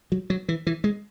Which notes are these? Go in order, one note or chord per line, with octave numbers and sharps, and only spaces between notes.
F#3
F#3
E3
E3
G#3